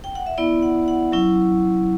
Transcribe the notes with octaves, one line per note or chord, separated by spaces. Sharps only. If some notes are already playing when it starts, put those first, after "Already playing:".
G5
F#5
E5
B3 E4 D5
F#5
F#5
F#3 C#4 E4